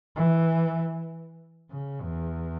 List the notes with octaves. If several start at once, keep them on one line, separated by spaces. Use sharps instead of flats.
E3
C#3
E2